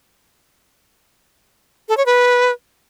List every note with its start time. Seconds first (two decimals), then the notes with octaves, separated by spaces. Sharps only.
1.89 A4
1.97 C#5
2.06 B4